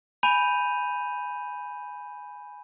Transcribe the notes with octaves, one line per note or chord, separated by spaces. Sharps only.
G#5 B5 G6 D#7 F7